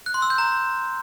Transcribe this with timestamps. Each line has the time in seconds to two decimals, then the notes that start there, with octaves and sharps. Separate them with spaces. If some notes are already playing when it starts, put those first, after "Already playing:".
0.06 F#6
0.14 C6
0.22 E6
0.30 G6
0.38 A#5